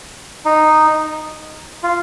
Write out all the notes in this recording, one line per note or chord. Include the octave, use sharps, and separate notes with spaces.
D#4
F4